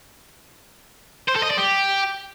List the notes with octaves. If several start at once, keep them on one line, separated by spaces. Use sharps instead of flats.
C5
A4
D#5
D5
G4